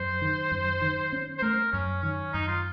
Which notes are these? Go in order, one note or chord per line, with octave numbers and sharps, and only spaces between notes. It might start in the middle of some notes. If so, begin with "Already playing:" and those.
Already playing: F#2 C5
D#3
F#2
D#3
C#4
C5
A3 A#4
F#2 C#4
D#3 C#4
F#2 D#4
F4